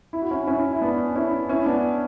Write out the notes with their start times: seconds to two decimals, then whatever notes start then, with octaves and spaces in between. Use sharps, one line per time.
0.13 E4
0.22 F#4
0.31 C#4 E4
0.47 C#4 E4
0.73 E4
0.81 B3 D4
1.16 C#4 E4
1.49 C#4 E4
1.66 B3 D4